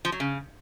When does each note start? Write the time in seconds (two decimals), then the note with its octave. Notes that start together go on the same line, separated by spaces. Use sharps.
0.05 F3
0.12 F#3
0.20 C#3